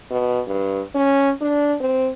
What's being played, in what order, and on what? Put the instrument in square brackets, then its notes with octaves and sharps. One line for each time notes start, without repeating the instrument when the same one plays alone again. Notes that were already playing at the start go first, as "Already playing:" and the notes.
[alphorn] B2
G2
C#4
D4
C4